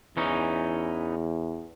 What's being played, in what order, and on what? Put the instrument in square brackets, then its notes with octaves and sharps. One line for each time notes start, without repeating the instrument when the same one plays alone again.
[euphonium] E2 [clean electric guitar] E3 C#4 D#4